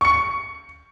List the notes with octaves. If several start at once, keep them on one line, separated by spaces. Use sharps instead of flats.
C#6 C#7